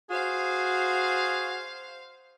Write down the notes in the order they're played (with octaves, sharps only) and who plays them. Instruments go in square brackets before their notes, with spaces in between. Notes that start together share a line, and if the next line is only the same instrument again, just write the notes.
[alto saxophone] F#4 [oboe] G#4 [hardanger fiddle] C5 F5